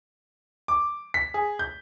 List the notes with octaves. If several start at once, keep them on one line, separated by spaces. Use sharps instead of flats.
D6
B6
G#4
G6